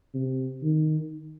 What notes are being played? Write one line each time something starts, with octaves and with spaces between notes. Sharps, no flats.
C3
D#3